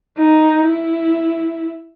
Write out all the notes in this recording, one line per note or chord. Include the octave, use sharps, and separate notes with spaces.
D#4
E4